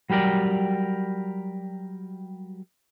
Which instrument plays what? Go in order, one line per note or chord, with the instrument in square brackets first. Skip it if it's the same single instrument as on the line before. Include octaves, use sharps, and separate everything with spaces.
[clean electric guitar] F#3 G3 G4 A#4 D5